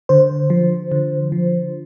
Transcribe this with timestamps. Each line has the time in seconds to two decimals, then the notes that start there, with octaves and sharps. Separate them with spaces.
0.09 D3 C5
0.50 F3
0.92 D3
1.32 F3